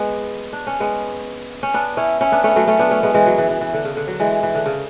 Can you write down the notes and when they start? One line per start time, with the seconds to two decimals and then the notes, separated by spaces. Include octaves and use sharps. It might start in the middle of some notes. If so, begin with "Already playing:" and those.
Already playing: G#3 B3
0.53 D4
0.67 C#4
0.80 G#3 B3
1.63 C#4
1.74 B3 D4
1.97 C#4 E4
2.21 C#4 E4
2.32 B3 D4
2.44 A3 C#4
2.56 F#3 A3
2.67 A3 C#4
2.79 B3 D4
2.91 A3 C#4
3.03 G#3 B3
3.14 E3 G#3
3.26 F#3
3.38 E3
3.50 E3
3.61 E3
3.74 D3
3.85 C#3
3.97 D3
4.07 F#3
4.20 E3 G#3
4.43 E3
4.55 D3
4.66 C#3